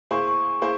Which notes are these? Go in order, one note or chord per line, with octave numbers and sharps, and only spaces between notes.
A#3 E4 G#4 C5 C#6
C#6
A#3 E4 G#4 C5